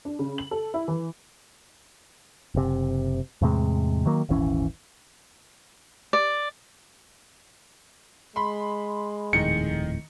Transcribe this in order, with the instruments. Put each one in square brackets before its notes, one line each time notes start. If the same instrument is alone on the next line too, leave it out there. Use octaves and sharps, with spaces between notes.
[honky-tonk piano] D4
C#3
F#7
A4
E4
E3
[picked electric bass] F#1 C3
E2 A2 C3 G#3
D#3 F#3 A#3
D#1 G#1 E3 C#4
[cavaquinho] D5
[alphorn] G#3 [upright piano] B5 C6
[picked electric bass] D#1 F2 A2 [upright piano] D#3 D#4 [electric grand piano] C#7